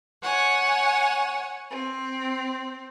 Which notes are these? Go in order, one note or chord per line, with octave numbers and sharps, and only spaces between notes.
C#5 F#5 G#5
C4